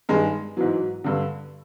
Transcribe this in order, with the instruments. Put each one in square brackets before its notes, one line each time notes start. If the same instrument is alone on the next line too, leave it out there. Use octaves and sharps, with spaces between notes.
[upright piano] G2 D#3 G#3
G#2 E3 F#3
G2 D3